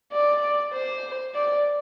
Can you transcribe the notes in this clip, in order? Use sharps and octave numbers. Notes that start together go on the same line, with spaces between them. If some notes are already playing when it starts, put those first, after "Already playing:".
D5
C5
D5